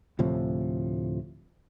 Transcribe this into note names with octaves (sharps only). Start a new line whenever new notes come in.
D2 A2 C3 F3